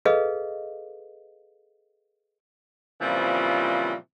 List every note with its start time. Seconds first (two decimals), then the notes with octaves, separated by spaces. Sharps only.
0.05 G#4 A4 B4 D#5 F5
3.01 A#2 C#3 E3 F3 G3 C4